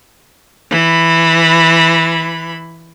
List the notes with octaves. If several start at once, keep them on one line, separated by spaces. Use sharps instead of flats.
E3 B5